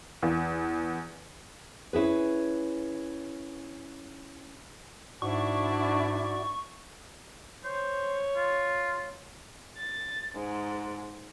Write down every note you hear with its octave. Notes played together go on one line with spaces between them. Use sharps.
E2
C#4 E4 G#4 B4
G#2 D4 E4 F#4 D5 C#6
C5 C#5
F4
A6
G#2